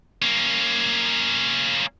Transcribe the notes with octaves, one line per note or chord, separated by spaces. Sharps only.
A#3 C#4